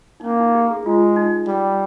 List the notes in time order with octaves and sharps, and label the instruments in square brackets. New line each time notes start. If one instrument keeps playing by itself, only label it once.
[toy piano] D#4
[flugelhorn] A#3 [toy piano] C#4
[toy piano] D#4
G4
G#4
[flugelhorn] G#3 [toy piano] F4
[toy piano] D#4
[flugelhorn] G3